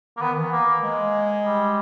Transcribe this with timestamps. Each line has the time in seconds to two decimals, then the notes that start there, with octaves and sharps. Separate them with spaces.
0.17 A#3
0.21 D#3 B3
0.37 E3
0.52 A#3
0.83 G#3
1.44 G3